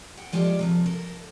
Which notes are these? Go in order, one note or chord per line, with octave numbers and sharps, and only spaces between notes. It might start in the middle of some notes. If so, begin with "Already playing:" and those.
F#5 G5
F3 G#3 F4 G4 A4 D5
C3 D#3 F3
A4 A#4